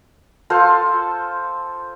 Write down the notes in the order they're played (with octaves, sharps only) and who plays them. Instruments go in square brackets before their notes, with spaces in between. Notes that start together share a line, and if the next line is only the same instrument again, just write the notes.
[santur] F4 A4 C5